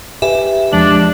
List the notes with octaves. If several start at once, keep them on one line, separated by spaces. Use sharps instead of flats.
G4 B4 E5 G#5
E2 F3 G#3 D4 F#7